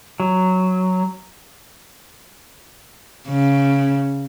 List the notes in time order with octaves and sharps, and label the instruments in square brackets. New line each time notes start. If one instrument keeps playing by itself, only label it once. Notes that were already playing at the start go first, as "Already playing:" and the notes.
[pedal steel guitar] F#3
[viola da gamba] C#3